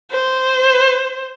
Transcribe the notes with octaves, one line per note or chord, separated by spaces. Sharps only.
C5